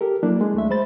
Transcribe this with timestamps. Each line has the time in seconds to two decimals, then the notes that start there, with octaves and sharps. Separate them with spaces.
0.01 G4 A4 A#4
0.23 F#3 A#3 D4 E4
0.41 G#3
0.54 D2 A3 E5
0.70 G#3 C5 B5 A6